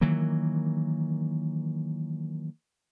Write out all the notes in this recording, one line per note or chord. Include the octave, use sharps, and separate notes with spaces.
D#3 E3 F#3 A#3